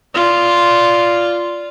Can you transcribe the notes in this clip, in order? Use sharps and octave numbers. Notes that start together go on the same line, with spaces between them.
F4 D5